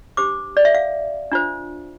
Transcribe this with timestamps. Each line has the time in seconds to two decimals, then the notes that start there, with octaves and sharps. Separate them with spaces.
0.17 D4 G4 C5 D6
0.57 D5
0.65 E5
0.75 F5
1.32 D4 F4 C5